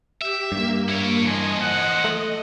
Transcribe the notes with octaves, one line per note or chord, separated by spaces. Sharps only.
G4 E5
G2 A#3
E4 C#5
E3 F3 D#5 G#5
F#5
A3